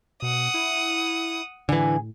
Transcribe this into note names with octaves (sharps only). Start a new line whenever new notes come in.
B2 F#5 D#6
E4
A2 D3 E3 G#4 G#5